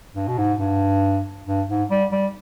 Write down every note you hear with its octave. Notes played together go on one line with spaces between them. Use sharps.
G2
B2
G#2
G2
G2
G#2
G3
G3